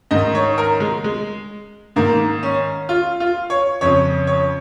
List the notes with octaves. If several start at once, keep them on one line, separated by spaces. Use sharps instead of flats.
G#2 D#3 D#5
C#5
A#4
G#3
G#3
G#2 D#3 A#3
C#4
F4
F4
C#5
F2 C#3 C#5
C#5